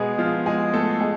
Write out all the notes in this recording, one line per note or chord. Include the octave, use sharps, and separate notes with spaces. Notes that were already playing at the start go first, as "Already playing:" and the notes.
Already playing: B2 G#3 B3 G#4
F3 F4
G#3 G#4
A3 A4
G#3 G#4